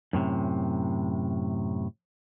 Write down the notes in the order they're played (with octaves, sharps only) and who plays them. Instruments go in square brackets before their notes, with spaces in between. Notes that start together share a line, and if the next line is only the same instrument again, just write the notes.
[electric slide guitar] F#2 A2 C3